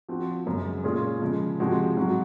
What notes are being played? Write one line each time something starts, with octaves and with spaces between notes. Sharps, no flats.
F3 C4 F#4
F#2 C#3 G#3
A#2 G#3 C#4 F4 G#4
C#3 F3 G#3
C3 F3 G#3 C4 F#4
G#2 F#3 C4 F#4